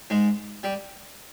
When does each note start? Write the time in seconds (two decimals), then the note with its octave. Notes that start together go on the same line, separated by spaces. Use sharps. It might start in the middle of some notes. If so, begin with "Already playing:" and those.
0.10 G#2 G#3
0.63 G3